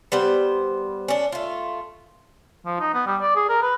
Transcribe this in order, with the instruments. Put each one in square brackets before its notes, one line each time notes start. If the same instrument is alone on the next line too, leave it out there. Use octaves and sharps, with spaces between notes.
[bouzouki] G3 B3 C5
C#4 D4
A3 F4
[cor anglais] F3
D#4
B3
G3
D5
G#4
A#4
B4